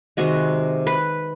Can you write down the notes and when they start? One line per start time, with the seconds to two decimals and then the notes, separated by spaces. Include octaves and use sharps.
0.17 C3 D#3 G#3 F#4
0.87 B4